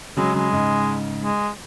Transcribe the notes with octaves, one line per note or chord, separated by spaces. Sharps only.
C#3 F#3 G#3
C#3 F#3 G#3
G#2 C#3
G#3